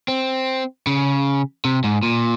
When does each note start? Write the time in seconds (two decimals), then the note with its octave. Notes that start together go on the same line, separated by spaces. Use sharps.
0.08 C4
0.87 C#3
1.65 C3
1.84 G#2
2.03 A#2